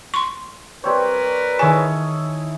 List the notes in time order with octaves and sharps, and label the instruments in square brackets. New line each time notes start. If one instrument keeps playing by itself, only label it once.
[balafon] C6 C#6
[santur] G3 C4 C#5 [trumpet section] A#4 B4
[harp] D#3 A5 [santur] E4 G#4 C#5 [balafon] G#5